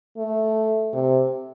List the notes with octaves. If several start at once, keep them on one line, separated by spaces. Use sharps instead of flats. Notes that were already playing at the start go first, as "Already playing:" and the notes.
A3
C3